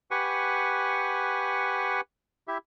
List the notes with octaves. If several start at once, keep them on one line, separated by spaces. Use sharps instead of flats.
G4 B4 F#5 G#5 C#6
E4 G4 E5